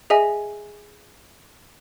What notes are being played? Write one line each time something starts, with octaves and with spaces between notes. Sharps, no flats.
G#4 D#5 E5 G#5